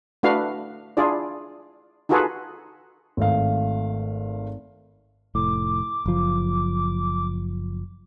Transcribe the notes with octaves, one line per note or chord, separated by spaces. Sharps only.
A3 D4 E4 F#4 B4 F5
D4 E4 F4 G#4 D5
D#4 F4 F#4 G#4 A4 B4
G#1 A3 F5
F1 A2 D6
F#1 F3